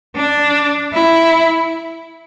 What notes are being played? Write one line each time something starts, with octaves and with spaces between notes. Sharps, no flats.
D4
E4